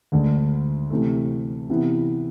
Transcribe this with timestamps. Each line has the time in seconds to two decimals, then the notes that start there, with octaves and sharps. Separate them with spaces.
0.12 D2 D3 G#3
0.90 C3 E3 A3
1.69 C3 E3 B3 E4